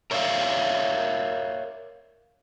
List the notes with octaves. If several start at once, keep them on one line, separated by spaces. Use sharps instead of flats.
A#4 C#5 D5 E5 F5